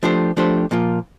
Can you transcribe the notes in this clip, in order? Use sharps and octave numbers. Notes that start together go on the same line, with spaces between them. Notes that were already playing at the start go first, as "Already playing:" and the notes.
F3 A3 D4 G4 C5
F3 A3 D4 G4 C5
A#2 F3 A#3 F4